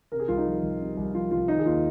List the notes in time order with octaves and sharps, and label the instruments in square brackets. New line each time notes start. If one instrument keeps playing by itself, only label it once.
[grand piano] C3 A#4
G#4
C2 F4
D#4
F3
C2
C3
C2
F3 F4
C2 F4
D#3 D#4
G#4
D#2 F4